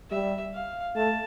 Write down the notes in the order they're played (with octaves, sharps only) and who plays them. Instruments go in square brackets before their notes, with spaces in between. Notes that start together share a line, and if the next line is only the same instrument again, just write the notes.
[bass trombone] G3 [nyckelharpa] E5
[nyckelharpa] F5
[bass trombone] A3 [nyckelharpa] A5